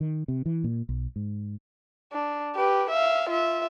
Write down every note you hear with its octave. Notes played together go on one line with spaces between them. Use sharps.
D#3
C3
E3
A#2
B1
G#2
D4
G4 B4
E5 F5
F4 E5